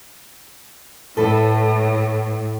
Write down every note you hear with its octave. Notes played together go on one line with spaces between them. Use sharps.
A2 A4 B4